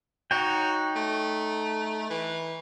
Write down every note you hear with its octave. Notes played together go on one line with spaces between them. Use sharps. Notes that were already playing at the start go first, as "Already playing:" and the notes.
D#4 F#4 C#5 G5
A3
E3